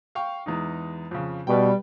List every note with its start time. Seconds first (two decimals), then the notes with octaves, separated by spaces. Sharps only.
0.15 F5 G5 C#6
0.46 E2 G#3 D#4
1.11 F2 C#3
1.47 B2 G3 B4 G5